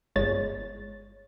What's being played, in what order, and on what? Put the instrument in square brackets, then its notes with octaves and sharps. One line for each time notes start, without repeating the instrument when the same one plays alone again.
[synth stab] G1 G#3 C#5 A6